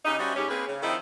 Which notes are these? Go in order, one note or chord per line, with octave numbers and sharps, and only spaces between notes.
C#3 D#4 G4
G3 C#4 F#4 C5 D#5 E5
G#2 C#4 G4
A#3 C4 G#4 B4
C#3
D#3 F3 C4 D#4 E4